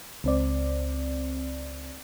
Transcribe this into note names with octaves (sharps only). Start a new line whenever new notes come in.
C#2 C4 D5